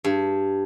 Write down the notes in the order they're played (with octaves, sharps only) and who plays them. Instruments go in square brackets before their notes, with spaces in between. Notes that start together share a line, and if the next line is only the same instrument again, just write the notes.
[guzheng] G2